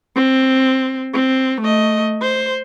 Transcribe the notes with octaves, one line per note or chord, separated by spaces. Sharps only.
C4
C4
A3 D#5
C5